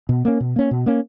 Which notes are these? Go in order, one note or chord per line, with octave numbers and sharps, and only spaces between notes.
B2
A#3 C#4
B2
A#3 C#4
B2
A#3 C#4